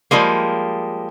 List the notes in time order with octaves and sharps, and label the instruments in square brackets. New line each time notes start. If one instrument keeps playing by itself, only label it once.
[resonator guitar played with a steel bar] F3 G3 G#3 A#3